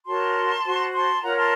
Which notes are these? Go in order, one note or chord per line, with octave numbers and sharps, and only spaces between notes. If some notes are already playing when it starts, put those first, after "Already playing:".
F#4 A#4 C#5 A5 C6
F#4 C5
A5 C6
F4 A#4 C#5 F#5 A#5
A5 C6